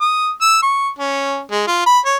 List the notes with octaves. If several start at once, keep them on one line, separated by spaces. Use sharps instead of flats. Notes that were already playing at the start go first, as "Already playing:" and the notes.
D#6
E6
C#6
C#4
G#3
F4
B5
C#5